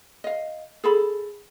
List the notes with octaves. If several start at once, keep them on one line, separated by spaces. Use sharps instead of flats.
D#5 F5
G#4 A4 B5